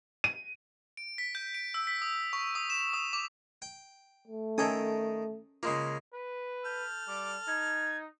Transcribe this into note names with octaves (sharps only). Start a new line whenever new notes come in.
D#7
D7
B6
G6
D7
E6
B6
D#6
C#6
D#6
E7
D#6
D6
G5
A3
D#3 C#4 A4 G5 G#5 D#6
C#3 G#3 A#3 F4
B4
A4 F6 G6
G3 D6
D#4 G#6